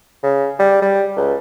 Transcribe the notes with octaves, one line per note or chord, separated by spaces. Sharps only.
C#3
G3
G3
C#2